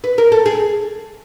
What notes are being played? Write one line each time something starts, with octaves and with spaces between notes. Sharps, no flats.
B4
A#4
A4
G#4